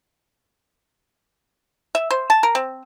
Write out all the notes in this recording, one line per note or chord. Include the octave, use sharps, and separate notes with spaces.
E5
C5
A5
A#4
C4